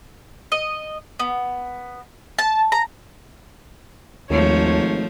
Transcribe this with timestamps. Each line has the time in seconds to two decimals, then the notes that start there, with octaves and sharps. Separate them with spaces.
0.52 D#5
1.19 B3
2.39 A5
2.72 A#5
4.30 G#1 D#2 F3 A3 C#5